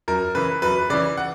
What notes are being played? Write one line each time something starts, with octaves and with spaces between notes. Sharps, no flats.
F#2 A#4
C#3 E3 B4
F#2 B4
C#3 E3 D5
F#5